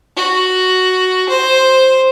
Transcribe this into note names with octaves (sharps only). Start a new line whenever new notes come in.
F#4
C5